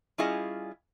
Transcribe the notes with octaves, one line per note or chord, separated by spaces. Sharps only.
G3 C#4 E4 F4 G#4 D#5